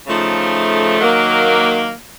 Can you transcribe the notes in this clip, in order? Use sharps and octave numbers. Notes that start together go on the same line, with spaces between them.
C#3 F3 A3 D#4
D#3 F#3 A#3